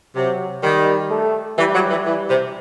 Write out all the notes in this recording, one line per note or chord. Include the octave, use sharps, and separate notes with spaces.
C3 F#3
D#3 G3
A3
E3 G3
F#3
E3
E3 G3
C3